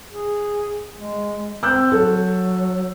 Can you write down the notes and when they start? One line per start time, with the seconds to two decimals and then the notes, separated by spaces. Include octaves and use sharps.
0.10 G#4
0.96 G#3
1.63 C4 E6 F#6 G6
1.92 F#3 A4